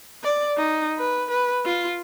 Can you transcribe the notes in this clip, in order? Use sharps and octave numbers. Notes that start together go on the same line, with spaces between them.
D5
D#4
B4
B4
F4